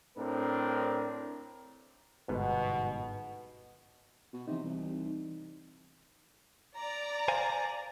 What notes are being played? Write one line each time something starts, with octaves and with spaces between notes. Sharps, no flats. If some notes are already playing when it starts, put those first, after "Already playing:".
A2 C4 D4 A#4
G1 G#2 B2 B3
B2
C3 E3 D#4
C2
D5 A#5
C5 F5 G#5